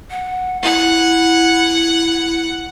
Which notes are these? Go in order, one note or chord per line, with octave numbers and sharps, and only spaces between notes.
F#5
E4 F#5